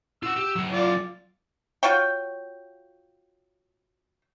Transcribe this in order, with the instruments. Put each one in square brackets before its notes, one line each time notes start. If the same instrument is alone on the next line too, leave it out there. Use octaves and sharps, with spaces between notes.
[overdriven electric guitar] F4 F#5 [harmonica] E6
[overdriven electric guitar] G4
F#3 G#4
[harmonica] F4 D5
[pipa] F4 F#4 C#5 G5